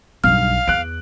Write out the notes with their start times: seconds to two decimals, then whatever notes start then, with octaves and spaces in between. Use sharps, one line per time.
0.24 B1 G2 F5 F6
0.67 E2 F#6 D7